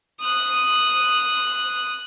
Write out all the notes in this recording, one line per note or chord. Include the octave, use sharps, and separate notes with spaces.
D#6 F#6